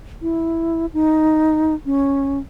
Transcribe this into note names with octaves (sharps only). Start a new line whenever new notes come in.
E4
D#4
C#4